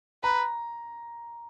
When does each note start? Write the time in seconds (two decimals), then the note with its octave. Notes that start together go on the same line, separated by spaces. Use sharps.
0.23 B4 A#5